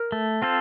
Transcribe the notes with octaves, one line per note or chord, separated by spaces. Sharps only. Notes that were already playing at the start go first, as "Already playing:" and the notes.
Already playing: A#4
A3
C4 F4 A4 C5